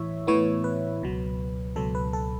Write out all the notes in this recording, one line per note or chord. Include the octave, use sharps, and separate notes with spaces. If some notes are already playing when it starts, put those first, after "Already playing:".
Already playing: A2 E3 E4 C#5 E5
A2 E3 B3 E4 C#5
B4
C#2 B2 F#3
C#2 B2 F#3 A4
B4
A4